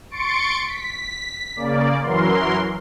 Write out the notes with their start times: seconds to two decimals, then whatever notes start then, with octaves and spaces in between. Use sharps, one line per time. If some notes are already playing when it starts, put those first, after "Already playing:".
0.11 C6 C#6 A6 C#7 D7
0.65 B6
1.56 C#3 A#3 D5
2.01 F#2 E3 F#3 A#4 C6